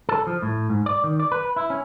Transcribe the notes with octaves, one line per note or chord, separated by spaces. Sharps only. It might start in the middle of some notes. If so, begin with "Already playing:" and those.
A4
F3
A2
G#2
D5
D#3
D5
B4
E4
C#4